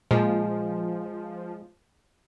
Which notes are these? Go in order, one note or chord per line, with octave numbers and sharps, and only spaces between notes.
A#2 F3 G#3